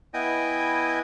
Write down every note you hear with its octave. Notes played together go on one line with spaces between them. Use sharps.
B3 E4 D#5 G5 G#5